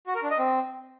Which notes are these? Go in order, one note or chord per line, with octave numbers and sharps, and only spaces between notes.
F#4
A#4
D4
D#5
C4